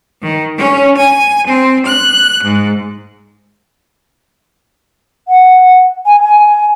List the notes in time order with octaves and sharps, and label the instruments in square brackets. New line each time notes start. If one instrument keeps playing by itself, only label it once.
[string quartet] D#3
C#4
G#5
C4
F#6
G#2
[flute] F#5
G#5
G#5